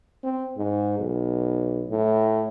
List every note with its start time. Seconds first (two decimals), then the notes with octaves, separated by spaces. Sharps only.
0.24 C4
0.57 G#2
0.99 B1
1.89 A2